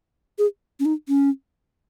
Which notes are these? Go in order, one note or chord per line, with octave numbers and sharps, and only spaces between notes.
G#4
C#4
D#4
C#4